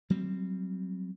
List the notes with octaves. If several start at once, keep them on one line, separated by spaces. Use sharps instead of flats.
F#3 G3 C4